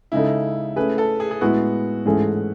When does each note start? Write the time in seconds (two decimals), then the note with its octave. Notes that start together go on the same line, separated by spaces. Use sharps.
0.12 C#3 G#3 D#4 E4 A4
0.76 A3 C#4 G#4 B4
0.98 A4
1.20 G#4
1.31 G#4
1.41 A2 G#3 B3 E4 F#4
2.05 G#2 E3 A3 C#4 G#4